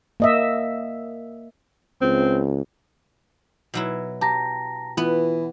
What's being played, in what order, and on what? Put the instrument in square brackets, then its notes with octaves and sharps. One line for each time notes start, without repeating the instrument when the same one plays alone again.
[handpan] A#3 D#5 E5
[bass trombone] C#2 [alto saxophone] C4
[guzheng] B2 F#3 E4
[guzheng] G4 [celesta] A5 A#5 A#6
[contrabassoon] E3 [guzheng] B3 [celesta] F4